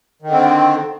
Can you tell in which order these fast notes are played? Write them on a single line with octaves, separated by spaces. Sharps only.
D#3 D3 C4